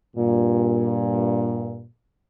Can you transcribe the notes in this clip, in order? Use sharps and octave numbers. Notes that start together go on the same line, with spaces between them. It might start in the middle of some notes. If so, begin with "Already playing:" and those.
G2 A#2